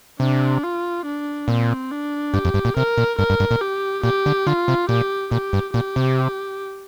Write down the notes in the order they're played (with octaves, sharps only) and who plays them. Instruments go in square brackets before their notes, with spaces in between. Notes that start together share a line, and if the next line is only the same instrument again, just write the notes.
[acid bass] C3 [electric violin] D4
[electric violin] F4
D4
[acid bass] A#2 [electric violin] C4
[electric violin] D4
[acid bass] G2 [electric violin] G4
[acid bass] F2
G2
A#2
[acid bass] C3 [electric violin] A#4
[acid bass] A#2
[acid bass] G2 [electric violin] A#4
[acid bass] G2
G2
A#2
[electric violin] G4
[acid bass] A#2 [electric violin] G4
[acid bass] D3
[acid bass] D3 [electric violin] F4
[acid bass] C3
[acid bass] A#2 [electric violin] G4
[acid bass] A#2 [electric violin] G4
[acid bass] G2
[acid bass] A#2 [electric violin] G4
[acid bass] C3